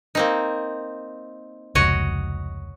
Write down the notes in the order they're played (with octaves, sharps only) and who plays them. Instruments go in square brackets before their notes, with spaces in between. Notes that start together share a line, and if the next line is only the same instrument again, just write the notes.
[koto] A#3 C4 D#4
[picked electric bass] F1 C#2 [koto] F#4 C#5 D#5